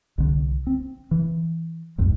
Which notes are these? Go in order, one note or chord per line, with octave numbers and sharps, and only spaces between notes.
C2 D3
C4
E3
C2 F2 G#2